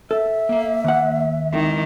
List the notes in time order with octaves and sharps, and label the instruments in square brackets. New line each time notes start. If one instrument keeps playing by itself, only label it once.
[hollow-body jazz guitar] A4 [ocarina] E5
[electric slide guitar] A#3 F5
[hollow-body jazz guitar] D#2 F#5
[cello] D#3 [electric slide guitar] G#3 C4 E4